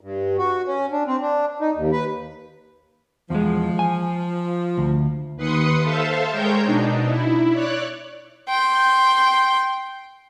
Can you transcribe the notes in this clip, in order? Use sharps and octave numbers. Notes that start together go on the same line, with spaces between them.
G2
F#4
C#4
D4
C4
D4
D#4
D#2
B4
E2 F3 G#3
G#5
D2
D#2 B4 C6 D#6 C#7
A4 C5 E5 F5 A5
G#3 A#4 C5 C#5 G5 G6
B2 D4 D#4
E4
C#5 D5 F#6
G5 C6